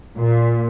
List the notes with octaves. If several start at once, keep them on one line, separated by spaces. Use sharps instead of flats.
A#2